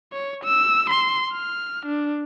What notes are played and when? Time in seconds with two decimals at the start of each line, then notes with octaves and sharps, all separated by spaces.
0.13 C#5
0.44 E6
0.90 C6
1.33 F6
1.86 D4